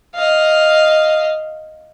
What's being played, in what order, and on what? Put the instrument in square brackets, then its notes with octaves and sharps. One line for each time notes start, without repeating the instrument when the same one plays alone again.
[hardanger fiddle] D#5 F5